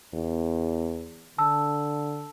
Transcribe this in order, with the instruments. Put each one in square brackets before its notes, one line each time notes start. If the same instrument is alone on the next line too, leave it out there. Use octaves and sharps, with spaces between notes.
[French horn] E2
[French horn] D3 [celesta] A5 E6